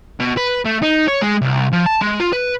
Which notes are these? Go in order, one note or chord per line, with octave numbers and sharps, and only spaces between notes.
B2
B4
A3
D#4
C#5
G#3
C2
F3
A5
G#3
F4
B4